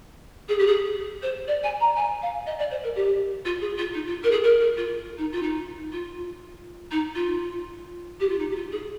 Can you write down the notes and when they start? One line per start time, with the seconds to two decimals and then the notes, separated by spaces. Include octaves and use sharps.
0.48 G#4
0.58 G4
0.66 G#4
1.22 C5
1.47 D5
1.63 G#5
1.80 A#5
1.96 G#5
2.21 F5
2.46 D#5
2.58 D5
2.70 C5
2.83 A#4
2.95 G4
3.45 F4
3.61 G#4
3.77 F4
3.93 D#4
4.06 F4
4.23 A#4
4.31 G#4
4.43 A#4
4.60 A#4
4.77 F4
5.17 D#4
5.32 F4
5.42 D#4
5.92 F4
6.91 D#4
7.15 F4
8.20 G4
8.29 F4
8.38 D#4
8.50 G4
8.55 F4
8.71 G#4